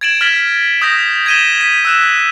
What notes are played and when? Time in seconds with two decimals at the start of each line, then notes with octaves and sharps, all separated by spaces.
0.01 G#6 A6 D7 E7 F#7
0.21 F6 G#6 A6 B6 F#7
0.82 D#6 G6 A#6 B6
1.26 G#6 B6 D#7 E7 G7
1.61 B6
1.85 E6 F#6 E7